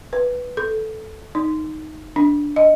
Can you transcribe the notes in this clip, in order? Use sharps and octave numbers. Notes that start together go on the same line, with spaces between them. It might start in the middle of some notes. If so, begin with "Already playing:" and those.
B4
A4
D#4
D4
D#5